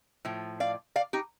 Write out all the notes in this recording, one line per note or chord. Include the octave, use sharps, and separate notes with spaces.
A2 F3
D5 F5
D5 F5
D#4 G4